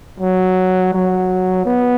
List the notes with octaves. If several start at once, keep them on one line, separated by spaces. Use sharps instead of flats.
F#3
F#3
B3